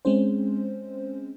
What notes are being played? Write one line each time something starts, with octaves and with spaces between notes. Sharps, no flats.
G#3 C4 C#4 C5